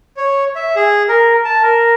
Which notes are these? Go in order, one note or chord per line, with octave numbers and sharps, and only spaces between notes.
C#5
E5
G#4
A#4
A5
A#4